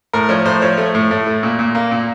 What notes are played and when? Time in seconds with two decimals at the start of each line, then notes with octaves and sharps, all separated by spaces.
0.13 A2 A#4
0.29 F3 C#5
0.45 A2 C5
0.62 F3 C#5
0.78 A3
0.95 A2
1.11 A2
1.27 A3
1.43 A#2
1.59 A#2
1.75 A#3
1.91 A#2